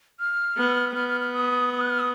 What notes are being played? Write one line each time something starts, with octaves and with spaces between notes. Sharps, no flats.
F6
B3
B3 F6
F6
F6
D#6
F#6
F6
D#6